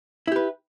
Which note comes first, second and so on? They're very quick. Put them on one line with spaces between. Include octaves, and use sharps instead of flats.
E4 G4 B4